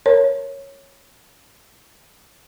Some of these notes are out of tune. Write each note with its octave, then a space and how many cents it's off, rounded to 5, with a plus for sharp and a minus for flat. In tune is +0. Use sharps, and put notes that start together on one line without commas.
A#4 +0 C#5 -10